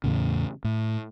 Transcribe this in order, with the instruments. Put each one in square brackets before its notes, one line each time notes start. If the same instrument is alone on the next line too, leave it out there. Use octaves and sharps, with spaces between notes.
[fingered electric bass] E2 A2 C#3
A2